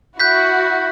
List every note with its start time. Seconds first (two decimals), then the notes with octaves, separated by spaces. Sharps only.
0.20 E4 F#4 F#6 G6 B6